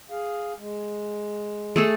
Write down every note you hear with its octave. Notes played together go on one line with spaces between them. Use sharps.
G#4 F5
G#3
A3 G#4 A4